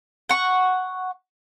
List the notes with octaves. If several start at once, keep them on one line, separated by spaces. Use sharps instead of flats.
F#5 C#6